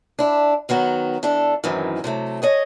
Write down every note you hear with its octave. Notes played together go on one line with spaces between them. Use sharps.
D4 E4
D#3 F#3 B3 F#4
E3 D4 A4
F#2 A2 D#3 E3 C4
C3 F#3 A3
G#4 C#5 D#5